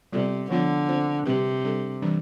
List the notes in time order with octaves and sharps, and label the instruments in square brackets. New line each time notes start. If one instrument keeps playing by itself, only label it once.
[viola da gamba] C3 [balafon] G3 B3 F4 A4 D5
[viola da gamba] D3 [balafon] F3 B3 F4
[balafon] C4 F4 C5
[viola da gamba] C3 [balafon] G3 C4 G4 B4
[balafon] G3 D4 A4
E3 G3 D4